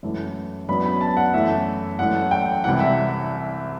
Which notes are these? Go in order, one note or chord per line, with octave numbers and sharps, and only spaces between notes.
F#2 E3 A3
F#2 F#3 B3 D4 B5
B5
A5
F#5
F#2 E3 A3 E5
F#2 E3 A3 F#5
G5
C2 C3 E3 F#5
E5